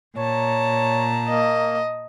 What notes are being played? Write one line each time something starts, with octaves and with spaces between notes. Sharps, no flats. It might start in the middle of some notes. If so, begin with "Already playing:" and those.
A#2 C#5 A5 A#5
A#3 D#5